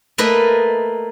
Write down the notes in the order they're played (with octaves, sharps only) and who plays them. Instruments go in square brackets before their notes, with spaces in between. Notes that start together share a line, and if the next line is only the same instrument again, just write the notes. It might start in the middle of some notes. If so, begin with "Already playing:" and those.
[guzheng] A3 A#3 B4 D#5